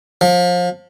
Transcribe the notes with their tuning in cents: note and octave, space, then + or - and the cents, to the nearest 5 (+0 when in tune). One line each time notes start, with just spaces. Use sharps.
F3 +30